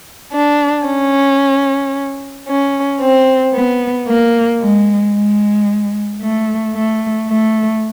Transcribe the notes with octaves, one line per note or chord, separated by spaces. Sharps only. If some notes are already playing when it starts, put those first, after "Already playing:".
D4
C#4
C#4
C4
B3
A#3
G#3
G#3
A3
A3
A3